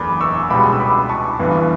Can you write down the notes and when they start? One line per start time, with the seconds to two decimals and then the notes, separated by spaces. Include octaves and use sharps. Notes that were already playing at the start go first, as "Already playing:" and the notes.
Already playing: F#1 E2 B5 D6
0.21 C#6 E6
0.50 C#2 B2 G3 B5 D6
0.73 E6
0.80 B5 D6
1.09 A5 C#6
1.39 G1 G2 E3 B3 D4